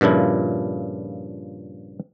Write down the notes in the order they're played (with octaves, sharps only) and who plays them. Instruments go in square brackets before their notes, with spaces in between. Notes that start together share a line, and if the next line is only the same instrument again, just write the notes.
[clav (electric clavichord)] G2 A#2 C#3 F3 E4